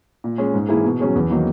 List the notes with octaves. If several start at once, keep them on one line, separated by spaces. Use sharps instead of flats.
A#2
G#3 C#4
G#2
E3 A#3 E4 G#4
B2
F#3 C#4 G#4
E2
D#3 F#3 A#3 D#4